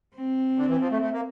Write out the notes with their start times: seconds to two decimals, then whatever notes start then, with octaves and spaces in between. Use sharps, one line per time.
0.15 C4
0.58 D3
0.69 E3
0.80 F3
0.91 A3
1.02 A3
1.13 A#3